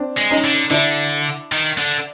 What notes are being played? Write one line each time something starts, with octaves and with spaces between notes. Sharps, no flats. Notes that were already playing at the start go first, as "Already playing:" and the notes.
Already playing: C4 D4
G#3
C#4 D#4
D3
D3 D4 E4
D#3
D3